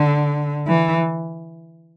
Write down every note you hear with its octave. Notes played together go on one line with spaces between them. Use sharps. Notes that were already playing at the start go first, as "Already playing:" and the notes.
Already playing: D3
E3